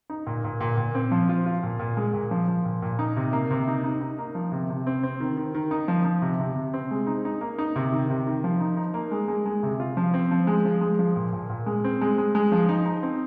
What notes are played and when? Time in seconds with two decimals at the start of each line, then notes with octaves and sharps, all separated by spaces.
0.10 D#4
0.27 A#2
0.44 A#2
0.61 A#2
0.77 A#2
0.95 C4
1.11 F3
1.29 F4
1.46 F4
1.63 A#2
1.79 A#2
1.97 G#3
2.14 A#2
2.31 F3
2.48 F3
2.65 A#2
2.82 A#2
2.99 D#4
3.16 C3
3.33 A#3
3.51 C3
3.68 D#4
3.84 D#4
4.01 D#4
4.18 A#3
4.35 F3
4.52 C3
4.69 C3
4.87 C4
5.03 C4
5.20 D#3
5.37 D#3
5.54 D#3
5.71 D#4
5.88 F3
6.05 F3
6.22 C3
6.39 C3
6.56 C3
6.74 C4
6.91 G#3
7.07 D#4
7.25 D#4
7.41 A#3
7.58 D#4
7.76 C3
7.92 D#3
8.10 C3
8.27 D#3
8.44 F3
8.60 D#4
8.77 D#4
8.94 A#3
9.11 G#3
9.28 G#3
9.46 G#3
9.63 C3
9.80 F4
9.97 F3
10.14 C4
10.31 F3
10.47 G#3
10.65 F3
10.81 G#3
10.99 F3
11.16 A#2
11.33 A#2
11.50 A#2
11.66 G#3
11.84 C4
12.01 G#3
12.18 G#3
12.35 G#3
12.52 F3
12.69 D#4
12.86 D#4
13.03 C4